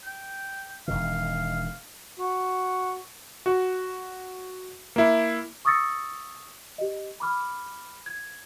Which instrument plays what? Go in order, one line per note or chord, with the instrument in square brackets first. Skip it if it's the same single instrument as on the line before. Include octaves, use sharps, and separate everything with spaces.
[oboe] G5
[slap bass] E1 D#3 [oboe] F5
[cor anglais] F#4
[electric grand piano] F#4
A#3 E4
[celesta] C#6 D#6 E6 A6 A#6 C#7
G4 D#5
B5 D6 F6
G#6